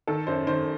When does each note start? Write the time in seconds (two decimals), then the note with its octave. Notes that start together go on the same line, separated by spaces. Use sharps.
0.07 D#3 A4
0.27 F#2 C5
0.47 D#3 C5